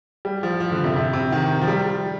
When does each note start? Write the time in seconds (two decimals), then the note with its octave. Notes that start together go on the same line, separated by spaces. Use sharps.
0.25 G3
0.43 F3
0.60 F3
0.72 D3
0.84 C3
0.96 C3
1.13 C3
1.32 D#3
1.62 F3
1.68 G3